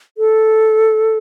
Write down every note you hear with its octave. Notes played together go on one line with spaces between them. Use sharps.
A4